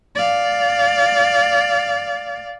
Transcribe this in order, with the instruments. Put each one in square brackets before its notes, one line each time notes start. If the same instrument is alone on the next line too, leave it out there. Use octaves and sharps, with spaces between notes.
[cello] D5 F5